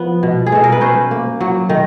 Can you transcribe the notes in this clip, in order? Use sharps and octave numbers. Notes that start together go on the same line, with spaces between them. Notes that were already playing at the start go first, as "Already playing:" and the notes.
Already playing: F3 B3
B2
G#4
B2 A4
A#4
B4
C#4 C5
A#3
F#3
D#3